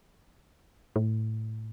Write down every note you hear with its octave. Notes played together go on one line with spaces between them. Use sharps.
A2